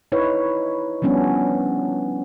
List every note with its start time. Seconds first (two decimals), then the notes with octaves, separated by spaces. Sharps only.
0.12 D#4 E4 B4 C#5
1.02 F3 G3 B3 C#4 D4